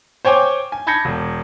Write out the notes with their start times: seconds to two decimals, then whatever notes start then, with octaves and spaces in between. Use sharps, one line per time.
0.25 C5 C#5 G5 G#5 D6
0.72 G#5
0.87 A5 B5 G6 G#6 A#6 C#7
1.05 E1